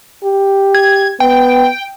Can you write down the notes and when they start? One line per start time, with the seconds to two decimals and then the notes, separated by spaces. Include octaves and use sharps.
0.24 G4
0.74 G#6
1.20 B3 G5